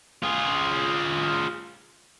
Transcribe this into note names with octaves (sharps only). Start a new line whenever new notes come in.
F4 G#4